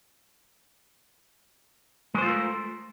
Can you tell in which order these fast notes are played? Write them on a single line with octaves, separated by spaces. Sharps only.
G#3 C5 F4 A3 A#4